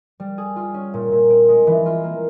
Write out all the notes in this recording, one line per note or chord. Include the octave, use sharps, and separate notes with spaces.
G3
G#4
F4
C#4
A#2
A#2
C4
G#3
E3
F4
A#3